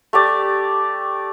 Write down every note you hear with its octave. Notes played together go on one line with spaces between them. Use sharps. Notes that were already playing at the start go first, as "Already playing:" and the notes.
A3 G4 D5